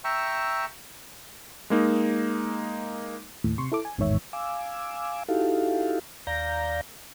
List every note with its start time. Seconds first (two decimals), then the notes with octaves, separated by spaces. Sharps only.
0.04 E5 G5 A#5 C#6 E6
1.70 G#3 A#3 D#4
3.44 D#2 A2
3.58 C3 C6 C#6
3.72 E4 A4 D6
3.85 G#5
3.98 A1 E2 G#2 D#3 C#5 E5
4.33 F5 G#5 D6 E6
5.28 D#4 E4 F#4 G4 A4 F5
6.27 D#2 D5 F5 A#5 G6 A#6